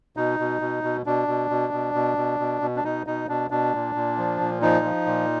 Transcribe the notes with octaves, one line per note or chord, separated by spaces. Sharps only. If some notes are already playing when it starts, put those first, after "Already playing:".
B2 D#4
B2
B2
B2
B2 D4
B2
B2
B2
B2
B2
B2
B2
D4
B2 D#4
B2 D#4
B2 D4
B2 D4
A#2
A#2
F3
A#2
F3 D#4
F3
A#2